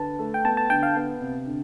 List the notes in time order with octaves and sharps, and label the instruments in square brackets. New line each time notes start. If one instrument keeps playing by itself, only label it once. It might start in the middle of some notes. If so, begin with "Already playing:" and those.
Already playing: [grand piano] D3 B4 [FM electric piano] A5
[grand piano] A3
[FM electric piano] G5
[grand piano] B3 [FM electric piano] A5
[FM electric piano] A5
[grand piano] D3 [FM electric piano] G5
[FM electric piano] F5
[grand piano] B3
C3
D3